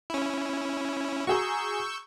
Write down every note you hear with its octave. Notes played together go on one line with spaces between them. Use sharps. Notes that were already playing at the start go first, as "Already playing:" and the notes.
C#4 E4
F#4 G#4 A#5 C#6 E6 G6